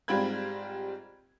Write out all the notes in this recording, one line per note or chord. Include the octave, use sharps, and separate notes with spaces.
G#2 G3 C4 F4 B5 G#6